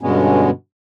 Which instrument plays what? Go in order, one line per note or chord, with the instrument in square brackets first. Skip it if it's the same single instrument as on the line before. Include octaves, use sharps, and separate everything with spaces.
[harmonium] G2 B2 D3 G#3 B3 C#4